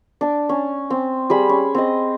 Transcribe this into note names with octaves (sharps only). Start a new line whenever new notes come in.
D4 D6
C#4
C4
G3 G#4 B5
C#4
C4 D#5